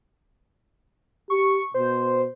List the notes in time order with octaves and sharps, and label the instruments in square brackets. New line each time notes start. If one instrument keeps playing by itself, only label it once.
[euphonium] G4 [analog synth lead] C#6
[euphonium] B2 [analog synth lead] C5